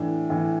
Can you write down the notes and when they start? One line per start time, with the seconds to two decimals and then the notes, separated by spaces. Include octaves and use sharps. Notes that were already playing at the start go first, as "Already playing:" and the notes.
Already playing: A2 E3 D4
0.30 A2 E3